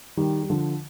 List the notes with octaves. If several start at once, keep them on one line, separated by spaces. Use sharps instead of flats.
D#3 G3
G3
D3 F3